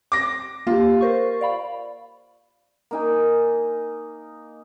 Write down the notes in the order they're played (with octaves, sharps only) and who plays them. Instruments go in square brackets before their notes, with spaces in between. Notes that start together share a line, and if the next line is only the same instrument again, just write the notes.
[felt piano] D6 A#6
[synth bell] A#3 G4 [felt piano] F4
[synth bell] A#4 C5 C#6
D5 F5 B5
[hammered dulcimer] A#3 D#4 G#5